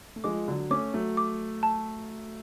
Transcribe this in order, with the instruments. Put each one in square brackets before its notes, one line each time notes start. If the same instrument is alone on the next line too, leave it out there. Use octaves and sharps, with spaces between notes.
[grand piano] A3
[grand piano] F3 G#3 [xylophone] D6
[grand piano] D3 F#3
[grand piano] A3 C#4 [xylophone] D6
[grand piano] F#3 A3
[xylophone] D6
A5